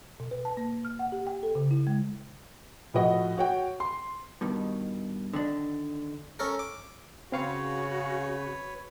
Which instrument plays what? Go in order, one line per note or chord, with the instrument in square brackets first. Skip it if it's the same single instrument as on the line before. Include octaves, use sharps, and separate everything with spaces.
[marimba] B2
B4
A5
A#3
F6
F#5
G4
G5
A4
C#3
E4
G#3
[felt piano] A2 F3 E4 F#4 D#5 F#5
F#4 C#5 F#5 G5
C6
[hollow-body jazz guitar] G2 B2 D#3
D3 D#3 D4
[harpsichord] C#4 A4 A#4
D6
[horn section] C#3 [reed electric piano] C4 F5 C#6 [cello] F#4 [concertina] B4 C#5